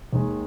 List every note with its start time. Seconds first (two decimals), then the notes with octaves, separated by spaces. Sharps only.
0.13 D#2 D#3 G#3